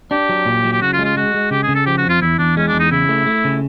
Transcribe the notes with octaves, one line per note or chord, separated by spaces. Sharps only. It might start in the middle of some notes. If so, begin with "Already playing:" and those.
D4 G4
F#3
A#2
F#3
G4
C#3 F#4
F4
G#3
F4
G#3 F#4
G#3
C#3 G4
G#4
C#3
A4
F3 G4
F#4
F2
F4
E2 E4
E2 D4
G#3 C#4
D4
E2
D#4
C#3 E4
A3
A3
C#3